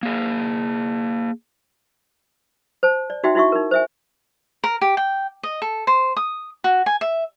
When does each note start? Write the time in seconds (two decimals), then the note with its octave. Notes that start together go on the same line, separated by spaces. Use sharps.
0.03 A#3 G#4
2.83 C5 A5
3.10 D5
3.24 D#4 F#4 E5 G5 C6
3.35 D#4 E4 F#4 E5 C#6
3.52 D#4 A#4
3.71 C5 E5 G#5
4.64 A#4
4.81 G4
4.97 G5
5.43 D#5
5.62 A4
5.87 C5
6.17 D#6
6.64 F#4
6.86 G#5
7.01 E5